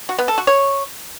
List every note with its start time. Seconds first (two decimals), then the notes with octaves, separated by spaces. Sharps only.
0.09 F#4
0.18 B3
0.28 A4
0.38 F#4
0.47 C#5